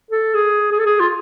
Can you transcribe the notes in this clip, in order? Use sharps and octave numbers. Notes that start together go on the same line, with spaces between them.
A4
G#4
G#4
A4
G#4
F4